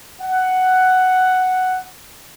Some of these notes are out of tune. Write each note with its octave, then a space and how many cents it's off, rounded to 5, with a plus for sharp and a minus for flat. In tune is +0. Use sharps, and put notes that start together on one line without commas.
F#5 +5